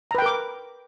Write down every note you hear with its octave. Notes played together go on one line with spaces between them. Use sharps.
A#4 B4 G5 A#5 D6